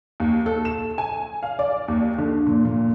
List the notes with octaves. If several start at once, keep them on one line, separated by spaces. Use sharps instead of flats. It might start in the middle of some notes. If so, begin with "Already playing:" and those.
D#2
A4
E7
G#5
F5
D5
D#2
D3
A#2
A#2